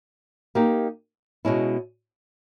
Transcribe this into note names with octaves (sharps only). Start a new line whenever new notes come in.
A#3 D#4 G4
B2 G#3 C#4 E4